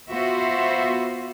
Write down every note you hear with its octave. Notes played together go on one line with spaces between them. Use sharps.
B3 F4 F#4 C5 E5